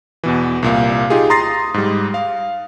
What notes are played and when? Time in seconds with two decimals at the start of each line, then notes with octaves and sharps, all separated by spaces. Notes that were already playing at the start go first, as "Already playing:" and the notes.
0.23 E2 B2 E3
0.62 C2 A#2 F5
1.10 D#4 F4 G4 G#4
1.30 A#5 C6 D#6 A6 A#6 C7
1.74 G#2 G3
2.14 F5